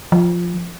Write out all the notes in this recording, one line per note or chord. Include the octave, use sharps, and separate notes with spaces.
F3